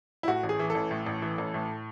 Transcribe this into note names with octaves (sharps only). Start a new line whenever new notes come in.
E4
A2 F#4
A1
G#4
E3
A4
A1
A2
A1
E3
A1
A2